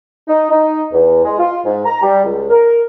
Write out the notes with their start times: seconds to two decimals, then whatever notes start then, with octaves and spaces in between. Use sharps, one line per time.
0.28 D#4
0.50 D#4
0.92 E2
1.24 G#3
1.39 F4
1.65 G#2
1.85 A#5
2.01 G3
2.24 C#2
2.49 A#4